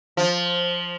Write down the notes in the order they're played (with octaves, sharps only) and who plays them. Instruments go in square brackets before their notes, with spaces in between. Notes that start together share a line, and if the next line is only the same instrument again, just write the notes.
[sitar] F3